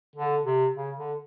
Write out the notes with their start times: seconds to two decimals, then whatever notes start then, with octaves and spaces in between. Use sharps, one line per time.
0.16 D3
0.45 C3
0.75 C#3
0.97 D3